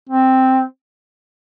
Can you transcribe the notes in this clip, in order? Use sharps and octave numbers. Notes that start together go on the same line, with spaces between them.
C4